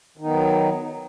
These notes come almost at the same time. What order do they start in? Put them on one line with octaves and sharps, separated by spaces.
D#3 D#4 B3 F#3